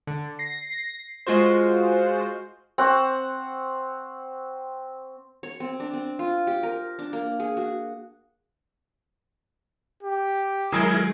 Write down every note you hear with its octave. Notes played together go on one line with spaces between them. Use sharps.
D3
A#6 C7
G#3 F4 F#4 C5
C4 F#5 C#6
C#5
C4
D4
C4
F4
G4
A#4
D4
A#3
G#4
F#4
G4
D#3 F#3 G#3 E4 G#4 A#4